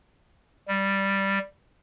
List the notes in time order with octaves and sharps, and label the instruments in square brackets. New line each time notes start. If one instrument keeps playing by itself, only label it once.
[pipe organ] G3